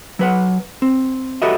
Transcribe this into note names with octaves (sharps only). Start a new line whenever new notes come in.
F#3 B4 F#5
C4
F#4 G4 A4 B4 D#5 E5